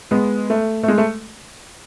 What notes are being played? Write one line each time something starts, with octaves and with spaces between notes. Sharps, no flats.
G#3 B3
A3
A3
G#3
A3